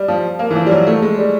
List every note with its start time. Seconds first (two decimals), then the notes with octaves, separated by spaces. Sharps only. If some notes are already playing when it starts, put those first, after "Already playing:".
Already playing: G3
0.08 F3
0.39 A#3
0.51 E3
0.55 F3
0.66 G3
0.71 F#3
0.87 A3
1.02 G#3
1.18 G3